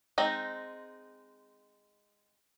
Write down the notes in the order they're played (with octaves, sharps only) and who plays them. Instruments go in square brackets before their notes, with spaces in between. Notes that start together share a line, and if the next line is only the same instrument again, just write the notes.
[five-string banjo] G#3 C4 D#4